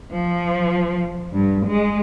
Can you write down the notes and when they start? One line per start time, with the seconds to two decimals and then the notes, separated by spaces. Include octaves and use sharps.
0.13 F3
1.35 G2
1.68 G#3